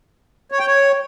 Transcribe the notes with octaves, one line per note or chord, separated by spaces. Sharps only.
C#5
G5
C#5